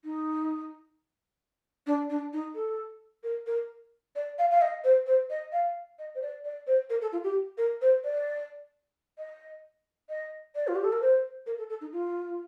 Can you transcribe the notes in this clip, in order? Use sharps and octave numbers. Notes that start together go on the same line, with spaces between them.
D#4
D4
D4
D#4
A4
A#4
A#4
D5
F5
F5
D#5
C5
C5
D#5
F5
D#5
C5
D5
D5
C5
A#4
A4
F4
G4
A#4
C5
D5
D#5
D#5
D5
F4
G4
A4
A#4
C5
A#4
A4
A4
D#4
F4